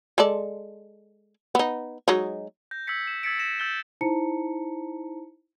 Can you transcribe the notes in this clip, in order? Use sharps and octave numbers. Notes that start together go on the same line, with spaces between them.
G#3 A4 D5
B3 D#4
F#3 G#3 D#4
G6 A#6
E6 G6 G#6 B6 C#7
E7
E6 G#6 A6 B6 C#7 D7
A#6 E7
E6 G6 A6 G7
D#4 E4 C5 A5 A#5 C#7